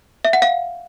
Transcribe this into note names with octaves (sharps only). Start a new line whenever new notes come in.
E5
F#5
F5